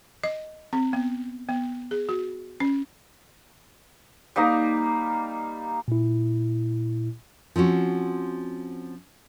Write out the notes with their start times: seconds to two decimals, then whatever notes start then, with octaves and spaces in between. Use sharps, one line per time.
0.24 D#5
0.73 C4
0.93 B3
1.49 B3
1.91 G#4
2.09 F#4
2.60 C#4
4.36 G3 A#3 D#4 A#5
5.88 A#2 E4
7.56 F3 C4 C#4 F#4